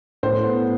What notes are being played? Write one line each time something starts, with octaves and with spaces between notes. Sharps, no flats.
A2 C5
B3